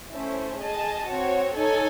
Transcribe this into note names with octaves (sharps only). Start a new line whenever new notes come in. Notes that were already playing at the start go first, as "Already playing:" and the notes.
A3 C#4 E4 C5
G#4 D#5 A5
C4 F#4 C#5
D#4 A4 C#5 G#5